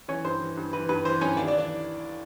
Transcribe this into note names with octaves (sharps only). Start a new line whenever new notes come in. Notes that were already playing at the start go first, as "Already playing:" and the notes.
E3 C#4 C#5
G2 C5
E3
G2
E3 B4
G2 B4
E3 C5
G2 C#4 C#5
D#2 D4 D5
D4 D5
E3
D4 D5